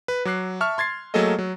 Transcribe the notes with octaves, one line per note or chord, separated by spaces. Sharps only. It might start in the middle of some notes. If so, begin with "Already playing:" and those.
B4
F#3 D6 F#6 C7
E5 A5 C#6 F6
C6 G#6 A6 C7
F#3 A3 A#3 G#4 A4 D#5
F#3